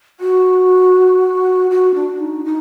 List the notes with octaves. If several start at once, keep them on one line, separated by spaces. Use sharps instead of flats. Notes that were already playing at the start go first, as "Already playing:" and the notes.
F#4
F#4
D4
D#4
D#4